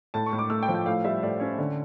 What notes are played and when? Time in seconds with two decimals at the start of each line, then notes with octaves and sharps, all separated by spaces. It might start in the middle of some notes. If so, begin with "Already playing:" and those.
0.14 A2 A5
0.26 C#6
0.33 A2
0.39 D6
0.50 A3 E6
0.63 G5
0.69 F3
0.74 G5
0.86 A2 F5
1.04 G3 E5
1.23 A2 D5
1.40 C#4 C#5
1.58 D3